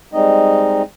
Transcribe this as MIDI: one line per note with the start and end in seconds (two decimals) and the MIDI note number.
0.13 0.82 55
0.13 0.82 56
0.13 0.82 60
0.13 0.82 63
0.13 0.82 75